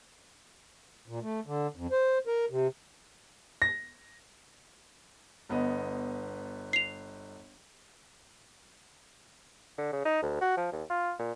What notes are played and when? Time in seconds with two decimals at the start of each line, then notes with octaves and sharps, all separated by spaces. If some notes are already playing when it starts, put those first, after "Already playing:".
1.08 A#2
1.22 A3
1.46 D3
1.76 F2
1.92 C5
2.27 A#4
2.50 C3
3.62 A#6
5.49 G1 B3 D#5
6.73 C7 F7
9.78 D3
9.93 C#3
10.05 D#4
10.22 D2
10.41 F#4
10.57 F3
10.72 D#2
10.90 F4
11.19 A#2